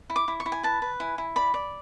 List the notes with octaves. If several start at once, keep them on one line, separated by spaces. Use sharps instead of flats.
E4
D6
E4
C#6
E4
G#5
B4 A5
B4
E4 G#5
E4
D5 B5
D5